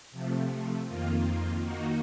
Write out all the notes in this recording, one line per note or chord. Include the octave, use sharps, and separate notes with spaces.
C3 F3 A3
F2 D#3 A#3 F4
D#3 A#3 D#4 F#4